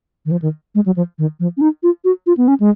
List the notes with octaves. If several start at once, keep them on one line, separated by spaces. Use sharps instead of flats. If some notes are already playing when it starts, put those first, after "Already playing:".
D#3
F3
D#3
G#3
F#3
F3
D#3
F3
C#4
D#4
F4
F#4
F4
B3
C#4
G#3